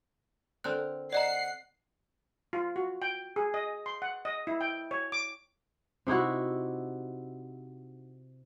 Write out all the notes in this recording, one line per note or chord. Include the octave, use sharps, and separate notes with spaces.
D3 C4 A#4 F#6
D5 D#5 F#5 A#5 C7
F4
F#4
G5
G#4
D#5
C6
F#5
D#5
E4
G5
C#5
D6
C3 D#4 E4 F#4